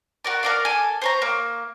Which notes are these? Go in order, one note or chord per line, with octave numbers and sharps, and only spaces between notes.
F#4 A#4 D5
A#4 D5 F5
A4 G#5
C5 C#5 A#5
A#3